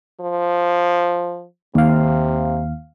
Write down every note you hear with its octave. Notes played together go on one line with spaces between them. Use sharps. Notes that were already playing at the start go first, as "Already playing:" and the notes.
F3
D#2 C3 F5